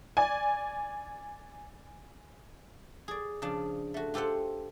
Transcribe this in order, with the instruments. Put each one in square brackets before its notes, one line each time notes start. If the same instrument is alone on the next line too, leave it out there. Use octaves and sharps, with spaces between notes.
[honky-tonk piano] D5 G#5
[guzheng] G#4 D5
C#3 F3 D4
A3 F#4
F4 G4 A4 C5 F#5